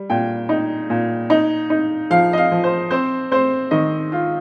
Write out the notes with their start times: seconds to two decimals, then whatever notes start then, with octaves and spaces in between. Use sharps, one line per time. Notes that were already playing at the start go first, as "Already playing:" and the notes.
Already playing: G3
0.10 A#2 G5
0.49 D#4
0.90 A#2
1.30 D#4
1.70 D#4
2.10 F3 F5
2.33 D#5
2.38 F5
2.51 F3
2.64 C5
2.91 C4 C5
3.31 C4 C5
3.71 D#3 D#5
4.12 F4